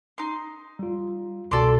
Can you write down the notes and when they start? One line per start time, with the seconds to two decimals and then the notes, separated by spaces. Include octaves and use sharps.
0.18 D#4 C6
0.79 G3 F4
1.51 C2 B2 F#4 A4 D5 C6